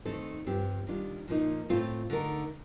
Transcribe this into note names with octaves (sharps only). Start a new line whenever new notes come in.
D#3 A3 C4 D#4 A4
G2 F3 C4 G4
D#3 G3 D4 F4
A#2 F3 A#3 D#4
A2 A3 C4 F4
D3 A3 D#4 A#4